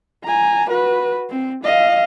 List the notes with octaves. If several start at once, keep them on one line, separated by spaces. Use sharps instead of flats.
G#5 A#5
F#4 B4
C4
D#5 F5